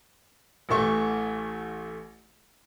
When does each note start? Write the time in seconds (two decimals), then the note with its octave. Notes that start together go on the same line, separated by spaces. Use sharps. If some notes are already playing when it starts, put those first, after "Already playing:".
0.69 A1 E3 A3 C#6